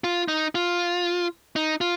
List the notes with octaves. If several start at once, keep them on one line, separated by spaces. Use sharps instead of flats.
F4
D#4
F4
D#4
F4